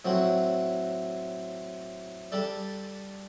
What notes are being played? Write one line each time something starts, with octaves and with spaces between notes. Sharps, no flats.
A2 F#3 C4 F#4
G3 D4 A4